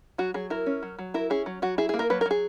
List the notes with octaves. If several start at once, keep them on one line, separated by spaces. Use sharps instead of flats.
F#3 F#4
F#3 G#4
E4 A#4
C#4
F#3
F#3
E4 A#4
C#4 G#4
F#3
F#3 F#4
E4 G#4
G#4
A#3
A#4
F#3 B4
A#4
F#3 G#4